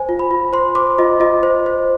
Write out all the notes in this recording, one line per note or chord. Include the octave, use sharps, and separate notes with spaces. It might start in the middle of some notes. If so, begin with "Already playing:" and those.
Already playing: C5 G#5
F4
B5
F4
C5 C6
C5 D6
F4 D#5
F4 D#5
C5
C5